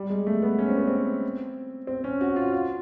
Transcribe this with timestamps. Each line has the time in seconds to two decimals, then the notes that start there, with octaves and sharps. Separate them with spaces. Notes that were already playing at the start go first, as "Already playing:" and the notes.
Already playing: G3
0.10 G#3
0.27 A3
0.42 B3
0.59 C#4
0.69 C4
0.77 B3
0.87 C4
1.87 C4
2.04 C#4
2.21 F#4
2.36 F4
2.52 F4